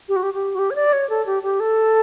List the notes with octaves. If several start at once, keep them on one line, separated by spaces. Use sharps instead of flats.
G4
F#4
G4
G4
F#4
G4
C#5
D5
C#5
A4
G4
G4
A4